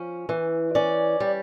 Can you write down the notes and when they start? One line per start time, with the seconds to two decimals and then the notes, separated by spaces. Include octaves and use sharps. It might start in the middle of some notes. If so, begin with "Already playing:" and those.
Already playing: F3 C#4
0.29 E3
0.75 C#4 D5
1.20 G3